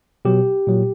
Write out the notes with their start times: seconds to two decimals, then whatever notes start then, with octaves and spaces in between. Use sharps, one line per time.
0.25 B2 F#3 G4
0.67 A#2 F#3